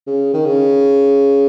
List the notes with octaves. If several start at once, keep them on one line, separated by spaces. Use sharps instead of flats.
C#3
D#3
C#3